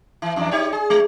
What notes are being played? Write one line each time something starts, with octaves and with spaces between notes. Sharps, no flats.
E3
F2 E3 D4
D#4 G4 C#5
G#4
G#3